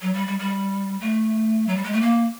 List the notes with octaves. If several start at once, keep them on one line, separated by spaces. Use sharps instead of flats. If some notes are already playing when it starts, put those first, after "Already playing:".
F#3
G3
G3
G3
A3
F#3
G3
G#3
A3
A#3